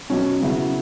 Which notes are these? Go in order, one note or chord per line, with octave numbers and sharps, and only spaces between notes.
B2 F#3 C#4
C#3 F#3 B3 E4